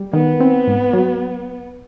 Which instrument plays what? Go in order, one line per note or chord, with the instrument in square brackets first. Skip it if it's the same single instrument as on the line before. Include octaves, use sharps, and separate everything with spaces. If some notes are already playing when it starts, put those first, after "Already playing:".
Already playing: [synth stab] G3
[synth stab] D#3 [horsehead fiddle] B3
[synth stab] C4
G#2
F#3